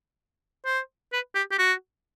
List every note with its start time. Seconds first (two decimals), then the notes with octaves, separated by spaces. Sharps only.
0.65 C5
1.12 B4
1.35 G4
1.51 G4
1.58 F#4